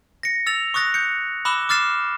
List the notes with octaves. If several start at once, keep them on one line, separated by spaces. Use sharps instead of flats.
A#6 C#7
E6 A6 F7
C#6 D#6 F#6 A6 A#6
G6 C#7
B5 D6 E6 F#6 E7 G7
D6 F6 A6 C7 E7